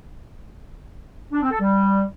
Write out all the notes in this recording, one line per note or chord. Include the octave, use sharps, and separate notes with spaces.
D4
C4
A4
G3